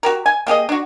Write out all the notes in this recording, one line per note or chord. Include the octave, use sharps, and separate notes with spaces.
F#4 G4 A#4
G#5
A#3 G4 G#4 D#5
D4 F#4